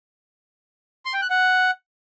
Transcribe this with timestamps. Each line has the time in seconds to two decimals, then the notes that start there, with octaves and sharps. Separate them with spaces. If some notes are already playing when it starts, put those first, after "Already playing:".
1.05 C6
1.14 G5
1.22 F#6
1.30 F#5